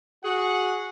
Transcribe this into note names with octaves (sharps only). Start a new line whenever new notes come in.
F#4 G#4 F#5